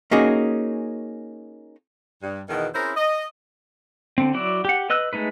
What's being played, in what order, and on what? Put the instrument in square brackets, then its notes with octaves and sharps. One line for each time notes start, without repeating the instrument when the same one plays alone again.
[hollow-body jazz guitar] A#3 C#4 D#4 F#4 G#4
[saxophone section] G2
E2 B2 D#3
C4 C#4 E4 G#4 A#4 C5
D#5
[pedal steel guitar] D3 C4
F#3 E4 F#4 D5
G4 F#5
B4 D#5 E6 F#6
G#3 A3 D#4 B4